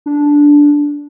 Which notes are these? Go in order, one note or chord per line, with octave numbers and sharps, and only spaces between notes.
D4